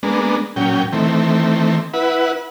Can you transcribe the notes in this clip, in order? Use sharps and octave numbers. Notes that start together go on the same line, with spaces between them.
G#3 A#3 B3 D4
A#2 F#3 C#4 G5
D#3 E3 A3 C4
E4 B4 F#5